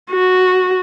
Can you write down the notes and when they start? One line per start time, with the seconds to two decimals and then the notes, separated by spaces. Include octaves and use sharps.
0.11 F#4